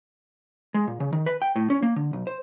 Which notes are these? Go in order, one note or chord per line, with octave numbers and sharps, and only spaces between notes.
G#3
A#2
C#3
D#3
B4
G5
A2
C#4
A#3
D3
B1
C5